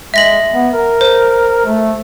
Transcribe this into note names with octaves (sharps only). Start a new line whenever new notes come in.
G#3 E5 A#6 F#7
B3
A#4
C5
A3